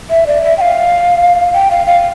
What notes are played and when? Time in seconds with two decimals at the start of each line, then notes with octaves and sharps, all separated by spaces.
0.10 E5
0.27 D5
0.42 E5
0.58 G5
0.61 F5
1.54 G5
1.71 F5
1.87 F5